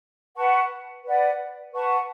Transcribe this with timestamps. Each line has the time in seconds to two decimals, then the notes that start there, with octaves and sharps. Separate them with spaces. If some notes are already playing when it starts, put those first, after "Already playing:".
0.36 B4 F#5 A5 C#6
1.05 B4 D5 F#5
1.73 B4 F#5 A5 C#6